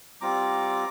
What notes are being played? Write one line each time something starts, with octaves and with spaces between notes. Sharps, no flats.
G3 C4 F4 A#5 D6